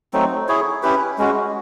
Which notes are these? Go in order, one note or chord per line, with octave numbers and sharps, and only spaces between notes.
F#3 A3 C4 D#4
E4 G#4 C#5
C#4 E4 G4 B4
G#3 C#4 F#4